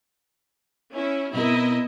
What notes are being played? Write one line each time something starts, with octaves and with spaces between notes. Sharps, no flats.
C#4 E4
B2 B3 C4 E4 A#4 D#5